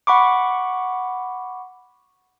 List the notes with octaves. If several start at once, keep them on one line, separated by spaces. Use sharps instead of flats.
F#5 B5 C#6 D6